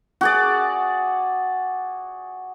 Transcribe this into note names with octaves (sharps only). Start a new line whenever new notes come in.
F#4 G#4 D5